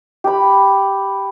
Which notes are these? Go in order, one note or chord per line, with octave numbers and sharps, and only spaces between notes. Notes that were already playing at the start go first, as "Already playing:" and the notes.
G4 B5